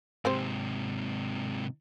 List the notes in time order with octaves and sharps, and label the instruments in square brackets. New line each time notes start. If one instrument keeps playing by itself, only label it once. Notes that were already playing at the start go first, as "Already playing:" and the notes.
[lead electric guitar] G#2 C3 [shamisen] C4 G4 C5